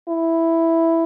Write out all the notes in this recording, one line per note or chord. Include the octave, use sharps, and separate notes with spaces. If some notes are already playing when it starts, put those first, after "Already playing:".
E4